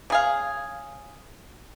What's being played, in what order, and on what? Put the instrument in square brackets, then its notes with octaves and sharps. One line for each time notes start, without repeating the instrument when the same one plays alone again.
[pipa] C#3 G#4 F5